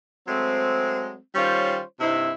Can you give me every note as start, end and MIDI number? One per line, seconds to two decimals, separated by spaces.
0.28 1.17 54
0.28 1.17 56
0.28 1.17 57
0.28 1.17 60
1.35 1.80 51
1.35 1.80 55
1.35 1.80 61
1.35 1.80 65
1.35 1.80 72
1.35 1.80 73
2.00 2.32 43
2.00 2.32 48
2.00 2.32 60
2.00 2.32 63
2.00 2.32 64